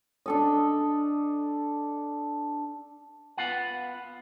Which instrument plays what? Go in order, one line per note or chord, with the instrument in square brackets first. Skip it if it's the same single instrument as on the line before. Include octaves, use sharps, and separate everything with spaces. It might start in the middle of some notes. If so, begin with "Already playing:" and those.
[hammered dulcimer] D4 A4 D#5
[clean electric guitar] B3 F4 F#5